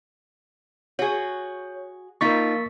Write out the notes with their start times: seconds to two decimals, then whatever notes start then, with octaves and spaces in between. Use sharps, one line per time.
0.99 F#4 G#4 C#5
2.21 F3 A#3 D#4 F4 A#4 C#6 A6 B6